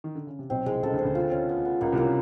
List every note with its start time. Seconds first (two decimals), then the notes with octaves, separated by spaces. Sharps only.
0.04 D#3
0.15 D3
0.27 C#3
0.39 C3
0.50 B1 B2 C4
0.66 C2 C3 G#3
0.83 C#2 C#3 A4
0.94 D2 D3
0.99 C5
1.05 D2 D3
1.15 F4
1.32 C#4
1.49 B3
1.65 B3
1.81 C#2 C#3 A#3
1.92 C2 C3 A#3
2.03 C#3